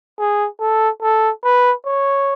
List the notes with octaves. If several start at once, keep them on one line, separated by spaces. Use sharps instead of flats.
G#4
A4
A4
B4
C#5